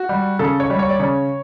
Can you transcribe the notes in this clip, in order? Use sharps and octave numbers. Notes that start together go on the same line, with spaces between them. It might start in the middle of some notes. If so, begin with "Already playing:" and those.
Already playing: F#4
G3
C#3 A4
C#5
G3
C#5
D5
C#3 C#5